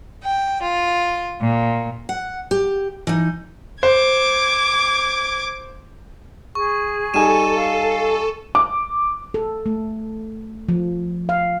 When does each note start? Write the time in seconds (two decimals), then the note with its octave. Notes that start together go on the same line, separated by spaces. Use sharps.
0.23 G5
0.62 F4
1.40 A#2
2.09 F#5
2.51 G4
3.07 E3 D#4
3.83 C5 D6 G#6
6.55 G#4 C#6
7.14 G3 D#4 A4 G#5 D#7 E7
7.56 F5
8.55 D6
9.34 A4
9.66 A3
10.69 F3
11.29 F5